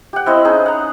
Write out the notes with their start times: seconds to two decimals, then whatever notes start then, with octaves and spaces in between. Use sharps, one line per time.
0.13 G4 F#5
0.26 C4 E4 D#5
0.45 C#4 D#4 G#4
0.66 F#5 A#5